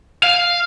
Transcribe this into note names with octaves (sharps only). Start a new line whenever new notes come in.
F5